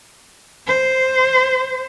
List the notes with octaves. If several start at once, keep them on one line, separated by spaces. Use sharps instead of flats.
C5